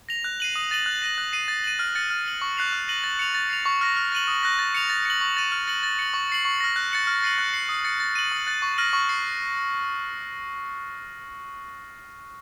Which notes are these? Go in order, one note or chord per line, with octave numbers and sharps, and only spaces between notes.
A#6 F7
F#6
C7 D#7 F#7
D#6
A6 D#7 F#7
F#6
A#6 D#7 F#7
F#6
C7 D#7 F#7
A6
D#7 F#7
F6
A6 C#7 F#7
F6
C7 F#7
C#6
F#6 C7 F7
F6
A#6 D#7 F#7
A6
C#7 F7
A6
C7 F7
C#6
F6 A#6
F6
A6 D#7 F#7
D#6
F#6 A#6
A6
C#7 F7
A6
C#7 F#7
C#6
A6 D#7 F#7
F6
A6 C#7 F#7
A6
C#7 F#7
C#6
A6 C7 F#7
C#6
F6 A#6
F#6
A6 C#7 F#7
F6
A6 C7 D#7 F#7
F#6
C7 F#7
D#6
A6 C#7
A6
D#7 F#7
D#6
F#6 A6
C#6
F6 A#6 D#7 F#7
C#6
A6 C7